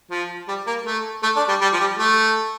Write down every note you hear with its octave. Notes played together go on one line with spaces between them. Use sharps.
F3
G3
A#3
A3
A3
D4
G3
G3
F3
G3
A3